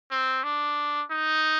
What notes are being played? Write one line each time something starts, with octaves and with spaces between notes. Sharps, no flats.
C4
D4
D#4